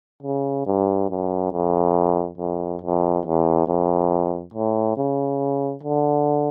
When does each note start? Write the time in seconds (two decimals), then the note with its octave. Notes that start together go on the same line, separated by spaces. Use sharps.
0.23 C#3
0.66 G2
1.09 F#2
1.52 F2
2.38 F2
2.82 F2
3.25 E2
3.68 F2
4.54 A2
4.97 C#3
5.83 D3